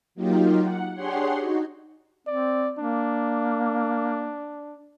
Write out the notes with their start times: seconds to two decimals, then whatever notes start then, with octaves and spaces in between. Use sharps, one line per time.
0.15 F#3 A#3 D#4 F4 G4
0.61 F#5
0.94 D4 G4 G#4 C#5 F#5 C6
1.38 D#4 F#4
2.27 C4 D5
2.79 A#3 D4